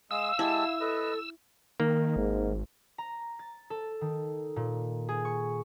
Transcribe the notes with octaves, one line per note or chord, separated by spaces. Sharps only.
G#3 F5 D#6 E6
G#3 E4 G4 A5
A4 B4 D#5
D#3 A#3
G#1 G#2
A#5
A6
A4
D#3
A#2
G#4
C#6